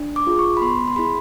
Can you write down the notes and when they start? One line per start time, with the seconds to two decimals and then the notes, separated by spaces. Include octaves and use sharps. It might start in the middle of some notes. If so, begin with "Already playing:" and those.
Already playing: D4
0.16 D6
0.27 F4 G#4
0.39 C#6
0.57 B5
0.61 B3 C6
0.87 C6
0.96 E4 G#4 B5